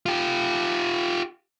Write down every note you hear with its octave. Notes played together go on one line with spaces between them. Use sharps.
F4 G4